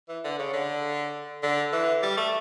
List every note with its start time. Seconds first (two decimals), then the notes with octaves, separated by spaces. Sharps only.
0.09 E3
0.24 D3
0.39 C#3
0.53 D3
1.43 D3
1.73 E3
2.03 G3
2.18 A3